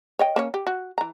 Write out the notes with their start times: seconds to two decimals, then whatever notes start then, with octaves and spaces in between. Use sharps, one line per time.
0.19 C#5 D#5 G5
0.36 A#3 C#4 C#5
0.54 G4
0.67 F#4
0.98 E3 A#5